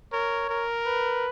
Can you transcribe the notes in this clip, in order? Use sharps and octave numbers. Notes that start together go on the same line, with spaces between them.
A#4 C#5
A#4
B4